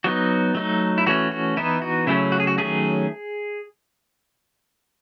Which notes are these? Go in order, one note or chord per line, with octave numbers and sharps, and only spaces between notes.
F#3 B3 D#4 F#4
F#3 A3 D#4
E4
E3 A3 C#4 F#4
F#4
E3 B3 D#4 E4
F#4
C#3 F#3 A3 C#4 E4
F#4
G#4
F#4
D#3 F#3 A3 C#4 G#4